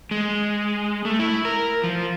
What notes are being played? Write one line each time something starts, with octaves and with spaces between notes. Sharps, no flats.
G#3
A3
E4
A#4
F3